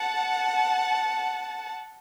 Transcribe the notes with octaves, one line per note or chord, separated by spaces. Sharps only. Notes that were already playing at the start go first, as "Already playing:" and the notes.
Already playing: F#5 A5